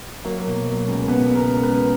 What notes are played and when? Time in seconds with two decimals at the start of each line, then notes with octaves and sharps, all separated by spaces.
0.25 F#3 A#3
0.46 B2
0.66 F#3
0.87 C#2
1.08 B2 B3
1.29 C#2
1.35 A#4
1.50 C#2
1.63 B4
1.70 C#2